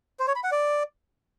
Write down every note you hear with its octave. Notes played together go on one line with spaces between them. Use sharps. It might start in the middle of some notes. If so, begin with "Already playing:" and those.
C5
C#5
B5
F#5
D5